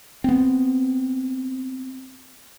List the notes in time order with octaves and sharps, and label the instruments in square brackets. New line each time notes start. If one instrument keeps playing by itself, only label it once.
[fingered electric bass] B3 C4